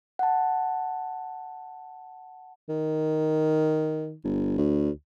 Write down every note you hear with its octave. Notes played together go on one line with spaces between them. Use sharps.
F#5 A5
D#3
G1
D2